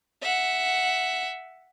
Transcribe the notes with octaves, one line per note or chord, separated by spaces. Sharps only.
E5 F#5